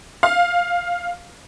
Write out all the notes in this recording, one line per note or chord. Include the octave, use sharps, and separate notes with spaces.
F5